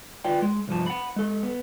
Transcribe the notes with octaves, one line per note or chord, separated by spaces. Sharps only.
F4 B4 D5 G5
G#3
C2 G2 F3 A5
F#5 B5
G#3 A4
B3